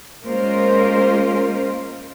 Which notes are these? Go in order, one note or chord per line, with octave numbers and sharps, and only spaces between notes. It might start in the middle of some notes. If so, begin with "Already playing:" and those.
G#3 A#3 C#4 F4 A#4 C5